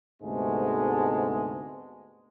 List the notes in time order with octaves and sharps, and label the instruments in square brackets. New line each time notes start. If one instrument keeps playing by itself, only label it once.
[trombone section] D2 G#2 C3 G#3 A3 B3